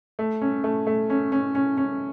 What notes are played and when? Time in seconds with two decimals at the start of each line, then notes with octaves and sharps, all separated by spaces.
0.19 A3
0.42 C#4
0.64 A3
0.87 A3
1.10 C#4
1.32 C#4
1.55 C#4
1.77 C#4